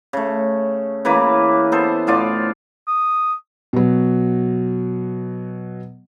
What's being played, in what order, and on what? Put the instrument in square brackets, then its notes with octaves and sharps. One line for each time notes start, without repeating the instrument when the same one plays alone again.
[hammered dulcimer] C#3 A3
C#3 E3 A#3 B4
B3 A4 C5
A2 D3 F4 D5
[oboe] D#6
[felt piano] B2 F#3